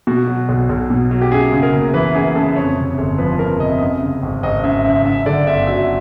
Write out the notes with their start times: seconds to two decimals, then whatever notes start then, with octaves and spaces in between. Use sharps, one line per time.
0.07 B2 F#4
0.28 F#3
0.49 B1
0.69 B1
0.90 B2
1.11 F#3
1.22 G4
1.32 F#2 G#4
1.52 C#3
1.63 A#4
1.73 F#1
1.94 E3 B4
2.14 F#2 G#4
2.35 C#3 A4
2.56 F2 C#5
2.77 C3
2.98 G1
3.18 F3 B4
3.39 F2 A#4
3.60 C3 D#5
3.69 E5
3.79 F#2 D#5
4.02 C#3
4.23 G#1
4.43 G#1 D#5
4.64 F#2 E5
4.85 C#3 E5
5.05 F#2 E5
5.26 D3 D5
5.47 G1 E5
5.67 F#3 E5